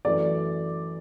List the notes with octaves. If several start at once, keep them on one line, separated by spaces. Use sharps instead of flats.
F#2 E3 A3 D5